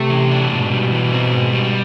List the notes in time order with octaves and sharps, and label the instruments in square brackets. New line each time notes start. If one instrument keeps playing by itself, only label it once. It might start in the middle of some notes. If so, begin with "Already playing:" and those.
Already playing: [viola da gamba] C3 [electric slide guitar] A3
[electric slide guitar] E3
D4
[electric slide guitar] G#2 [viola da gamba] B2
[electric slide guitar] G3
E3
C4
G#2
G3